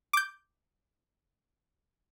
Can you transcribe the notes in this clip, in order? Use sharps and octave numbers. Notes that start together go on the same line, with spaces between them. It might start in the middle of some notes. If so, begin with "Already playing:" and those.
D6 G6